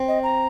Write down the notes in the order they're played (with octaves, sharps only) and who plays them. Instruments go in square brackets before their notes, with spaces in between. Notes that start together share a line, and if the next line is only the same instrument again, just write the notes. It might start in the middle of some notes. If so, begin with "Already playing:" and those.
Already playing: [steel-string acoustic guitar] C4
[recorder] D#5
A#5